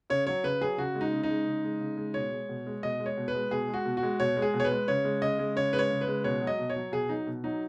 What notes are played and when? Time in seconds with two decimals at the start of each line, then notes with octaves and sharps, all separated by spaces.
0.10 C#3 C#5
0.27 F#3 C#5
0.43 C#3 B4
0.61 F#3 G#4
0.78 C#3 F#4
0.95 G#3
1.01 D#4
1.12 C#3
1.23 D#4
1.29 G#3
1.46 C#3
1.64 G#3
1.80 C#3
1.97 G#3
2.14 B2 C#5
2.32 G#3
2.49 B2
2.66 G#3
2.83 B2 D#5
3.00 G#3
3.06 C#5
3.17 B2
3.28 B4
3.34 G#3
3.51 B2 G#4
3.68 G#3
3.74 F#4
3.85 B2
3.97 F#4
4.03 G#3
4.20 B2 C#5
4.37 G#3
4.42 G#4
4.54 B2
4.60 C#5
4.64 B4
4.71 G#3
4.88 C#3 C#5
5.05 G#3
5.22 C#3 D#5
5.39 G#3
5.56 C#3 C#5
5.73 G#3 B4
5.79 C#5
5.90 C#3
6.01 B4
6.07 G#3
6.24 B2 C#5
6.42 F#3
6.47 D#5
6.59 B2
6.70 C#5
6.76 F#3
6.92 B2 G#4
7.09 F#3 D#4
7.27 B2
7.44 F#3 D#4